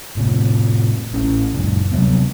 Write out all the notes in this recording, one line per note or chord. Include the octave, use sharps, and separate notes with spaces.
A2 C3
A1 A2 C#4
F#2 A#2
C3 F#3 G3 B3